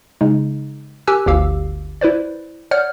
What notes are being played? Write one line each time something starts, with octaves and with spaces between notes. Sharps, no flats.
C#3 G#3 D#4
G4 A#4 G#5 E6 F#6
G1 D2 G4 F5 E6
E4 B4 C5 D5
C#5 D5 F#5 F6 G6